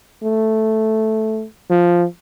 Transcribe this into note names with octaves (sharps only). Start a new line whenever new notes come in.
A3
F3